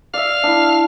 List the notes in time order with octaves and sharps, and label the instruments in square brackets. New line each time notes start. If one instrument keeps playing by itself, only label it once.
[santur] D5 E5 [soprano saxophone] F5
[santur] D4 E4